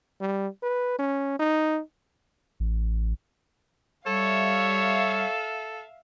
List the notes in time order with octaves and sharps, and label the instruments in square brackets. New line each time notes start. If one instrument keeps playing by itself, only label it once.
[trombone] G3
B4
C#4
D#4
[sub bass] A1
[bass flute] G3 [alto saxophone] A4 [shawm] C#5 [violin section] E5 F5